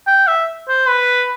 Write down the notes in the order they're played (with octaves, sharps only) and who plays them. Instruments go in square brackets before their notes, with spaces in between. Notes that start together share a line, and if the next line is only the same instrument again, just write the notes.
[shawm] G5
E5
C5
B4